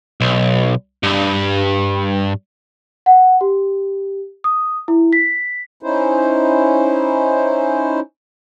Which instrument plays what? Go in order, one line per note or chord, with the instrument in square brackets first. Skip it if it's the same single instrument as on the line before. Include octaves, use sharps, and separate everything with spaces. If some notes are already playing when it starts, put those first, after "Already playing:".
[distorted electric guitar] B1
G2
[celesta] F#5
G4
D#6
E4
B6
[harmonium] C#4 D#4 E4 C5